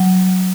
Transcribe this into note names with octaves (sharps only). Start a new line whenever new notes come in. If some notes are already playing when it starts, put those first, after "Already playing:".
Already playing: F#3